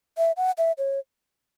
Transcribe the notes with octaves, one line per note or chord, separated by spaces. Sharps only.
E5
F#5
E5
C#5